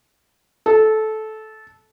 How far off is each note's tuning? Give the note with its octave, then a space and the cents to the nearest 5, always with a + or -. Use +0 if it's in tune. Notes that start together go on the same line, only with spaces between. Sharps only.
A4 -15